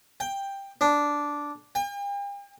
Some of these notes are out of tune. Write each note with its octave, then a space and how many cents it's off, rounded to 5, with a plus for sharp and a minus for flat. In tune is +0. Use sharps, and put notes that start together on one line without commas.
G5 +10
D4 -5
G5 +45